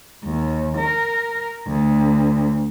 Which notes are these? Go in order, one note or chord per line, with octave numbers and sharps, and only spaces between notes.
D#2
A#4
D2